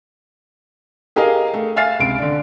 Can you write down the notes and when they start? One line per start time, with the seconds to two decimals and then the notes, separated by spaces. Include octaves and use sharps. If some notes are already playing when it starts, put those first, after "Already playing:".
1.16 G4 G#4 A#4 D#5 F5
1.54 A3
1.76 E5 F5 G#5 F6 A6 C7
1.99 C#2 C3 D7
2.18 D3 D4